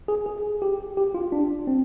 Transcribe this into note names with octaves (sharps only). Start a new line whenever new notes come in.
G#4
G#4
G4
G4
F4
D4
C4